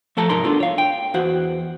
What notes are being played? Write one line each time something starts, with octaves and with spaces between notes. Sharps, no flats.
F3 A3 A4 A5 A#5
C2 G#2 D#4 A#4 A#5 C6
B3 D4 F4 A4
C#5 F5
G5
E2 F#4 C5 F#5